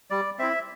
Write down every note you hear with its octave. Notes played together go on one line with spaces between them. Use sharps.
G3 D5
C4 E4 E5